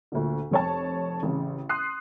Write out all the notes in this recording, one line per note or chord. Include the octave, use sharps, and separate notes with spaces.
D2 A#2 D3
F1 C#5 A5
A1 C#3
C6 D#6 F#6 C7